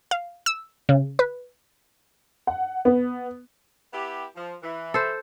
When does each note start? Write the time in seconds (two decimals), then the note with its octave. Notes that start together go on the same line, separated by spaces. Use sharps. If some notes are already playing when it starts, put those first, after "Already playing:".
0.11 F5
0.46 E6
0.89 C#3
1.19 B4
2.47 F#5
2.85 B3
3.93 B3 E4 G4
4.35 F3
4.62 E3
4.94 A4 C5